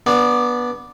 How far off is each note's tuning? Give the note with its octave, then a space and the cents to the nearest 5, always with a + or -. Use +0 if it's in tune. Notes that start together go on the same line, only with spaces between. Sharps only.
B3 -15 D4 +0